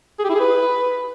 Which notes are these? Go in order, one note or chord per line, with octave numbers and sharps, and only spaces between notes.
G#4
G4
E4
G#4
B4